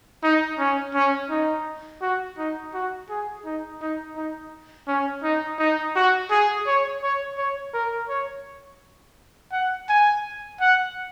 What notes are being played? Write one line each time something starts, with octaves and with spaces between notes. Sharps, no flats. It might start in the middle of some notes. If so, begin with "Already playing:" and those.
D#4
C#4
C#4
D#4
F#4
D#4
F#4
G#4
D#4
D#4
D#4
C#4
D#4
D#4
F#4
G#4
C#5
C#5
C#5
A#4
C#5
F#5
G#5
F#5